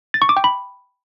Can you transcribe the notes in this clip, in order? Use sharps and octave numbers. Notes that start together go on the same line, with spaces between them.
A6
C#6
D6
G5
B5